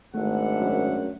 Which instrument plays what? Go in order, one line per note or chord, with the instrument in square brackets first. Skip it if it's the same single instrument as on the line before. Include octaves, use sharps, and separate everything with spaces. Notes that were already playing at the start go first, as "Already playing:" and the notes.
[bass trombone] G#1 [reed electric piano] A3 [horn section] D4 E5 F#5
[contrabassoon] F#2